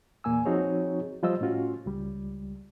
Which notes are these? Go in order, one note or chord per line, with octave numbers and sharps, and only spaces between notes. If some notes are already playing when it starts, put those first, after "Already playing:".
E2 A#2 A#3 G#5 E6
F3 C4 D#4 F#4 G#4 C#5
F3 G3 F4 C5 D#5 E6
A2 C#4 F4 F#4
C#2 G3